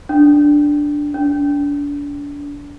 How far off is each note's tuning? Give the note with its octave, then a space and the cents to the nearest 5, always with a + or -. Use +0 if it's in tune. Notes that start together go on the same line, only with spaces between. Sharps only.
D4 +0
D4 -35